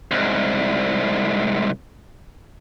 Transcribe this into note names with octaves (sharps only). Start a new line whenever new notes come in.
C2 G#2